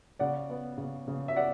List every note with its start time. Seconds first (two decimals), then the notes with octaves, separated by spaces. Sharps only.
0.19 C#3 D5 F#5
0.50 B3
0.78 C#3
1.08 C#3
1.28 E5
1.36 B3 D5 F#5